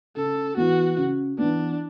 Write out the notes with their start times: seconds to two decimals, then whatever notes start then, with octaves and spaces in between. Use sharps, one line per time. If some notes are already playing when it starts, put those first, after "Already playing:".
0.16 C#3 A4
0.57 E3 B3 F#4
0.98 C#3
1.38 E3 B3 D4